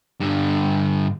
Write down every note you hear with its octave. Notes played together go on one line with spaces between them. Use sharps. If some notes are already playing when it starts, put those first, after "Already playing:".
G2 D3